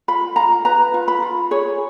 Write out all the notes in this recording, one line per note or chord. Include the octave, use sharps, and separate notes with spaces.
F4 B5
F4 A#5
B4 A#5
F4
B5
F4
G#4 C#5